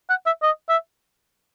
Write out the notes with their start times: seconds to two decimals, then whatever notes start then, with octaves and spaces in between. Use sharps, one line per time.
0.10 F#5
0.26 E5
0.43 D#5
0.69 E5